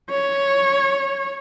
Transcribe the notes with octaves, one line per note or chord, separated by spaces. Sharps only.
C#5